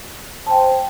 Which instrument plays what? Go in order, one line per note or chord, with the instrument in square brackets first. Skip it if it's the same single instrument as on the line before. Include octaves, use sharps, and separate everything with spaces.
[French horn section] C5 [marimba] G5 A5